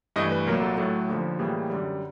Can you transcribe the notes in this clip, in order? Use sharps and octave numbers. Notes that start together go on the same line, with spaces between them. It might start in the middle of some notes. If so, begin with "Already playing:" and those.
G2 E3 A3 D#5
B4
C2 A#2 F#3 A#3 A#4
A4
A2 F#3 A3 A4
D#2 D3 F3
A2 E3 G3 A#3 G#4
F#2 D3 G3